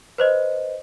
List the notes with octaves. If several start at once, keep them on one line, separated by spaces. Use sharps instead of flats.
B4 C5 D#5